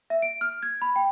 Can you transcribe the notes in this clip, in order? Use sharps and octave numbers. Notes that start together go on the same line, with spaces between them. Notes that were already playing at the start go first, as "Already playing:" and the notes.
E5
D7
F6
G#6
B5
G5